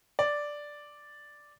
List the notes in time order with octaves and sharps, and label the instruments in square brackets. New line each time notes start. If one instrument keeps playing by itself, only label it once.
[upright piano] D5